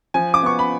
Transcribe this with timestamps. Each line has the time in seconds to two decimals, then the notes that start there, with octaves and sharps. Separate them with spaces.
0.14 F3 G#5
0.34 D6
0.43 B3 C#6
0.59 B5